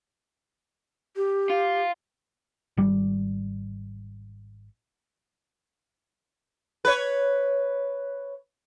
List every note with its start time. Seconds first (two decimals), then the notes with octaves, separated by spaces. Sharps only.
1.16 G4
1.50 F4
2.77 G#1 G3
6.85 B4 C#5